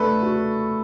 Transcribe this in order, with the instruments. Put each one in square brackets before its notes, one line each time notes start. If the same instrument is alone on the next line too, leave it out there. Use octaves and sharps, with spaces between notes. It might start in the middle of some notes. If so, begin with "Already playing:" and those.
Already playing: [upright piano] A3 D4 [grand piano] A4 B4
[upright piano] F#4